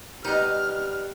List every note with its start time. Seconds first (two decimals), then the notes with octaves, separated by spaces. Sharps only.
0.25 B2 G3 D#4 G4 F6